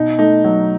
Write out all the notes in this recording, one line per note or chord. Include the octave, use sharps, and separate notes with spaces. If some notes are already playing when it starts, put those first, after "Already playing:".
Already playing: B2 D#4
A3 D#4
F#3